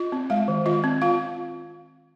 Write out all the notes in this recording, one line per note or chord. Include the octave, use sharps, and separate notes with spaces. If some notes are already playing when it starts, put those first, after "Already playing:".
Already playing: F4 D#5
C4
G#3 F5
D#3
F4 D#5
C4
F4 F5